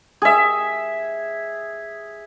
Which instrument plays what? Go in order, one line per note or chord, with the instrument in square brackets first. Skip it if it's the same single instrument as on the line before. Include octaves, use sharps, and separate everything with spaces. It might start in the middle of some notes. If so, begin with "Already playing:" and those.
[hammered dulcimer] G#4 E5